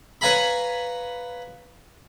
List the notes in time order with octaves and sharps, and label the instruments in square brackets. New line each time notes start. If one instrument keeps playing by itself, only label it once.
[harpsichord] B4 C#5 F5 G#5 A#5 B5